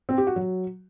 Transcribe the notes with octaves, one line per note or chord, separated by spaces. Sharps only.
C4
G4
F#4
F#3